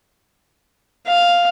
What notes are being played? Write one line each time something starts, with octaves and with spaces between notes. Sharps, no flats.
F5